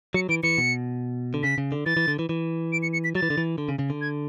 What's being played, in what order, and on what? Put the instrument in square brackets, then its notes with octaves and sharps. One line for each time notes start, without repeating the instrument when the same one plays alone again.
[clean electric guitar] F#3 [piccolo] C#7
[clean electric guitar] E3 [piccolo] D7
[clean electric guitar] E3 [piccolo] C#7
[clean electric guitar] B2
D3
[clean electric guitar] C#3 [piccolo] B6
[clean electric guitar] C#3
D3
[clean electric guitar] E3 [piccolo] A6
[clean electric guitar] E3
D3
E3
E3
[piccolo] D7
C#7
C#7
B6
[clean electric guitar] F#3 [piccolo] A6
[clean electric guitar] E3
D3
E3
D3
C#3
C#3
D3
[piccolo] G#6